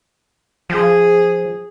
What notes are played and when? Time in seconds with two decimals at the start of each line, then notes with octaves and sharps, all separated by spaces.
0.70 F3 G#4